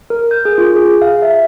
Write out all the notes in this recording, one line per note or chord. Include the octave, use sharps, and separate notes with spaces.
A#4
G6
G#4
F4
G#4
G#4
F5
E5